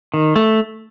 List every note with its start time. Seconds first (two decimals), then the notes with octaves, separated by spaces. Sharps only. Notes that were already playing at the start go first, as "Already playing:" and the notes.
0.14 D#3
0.36 A3